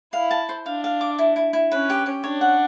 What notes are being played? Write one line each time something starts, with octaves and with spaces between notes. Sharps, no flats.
E4 F5
A5
C5
D4 F5
F5
D6
E4
E4
E4
C#4 B4
G4
G4
D4 C#5
F#5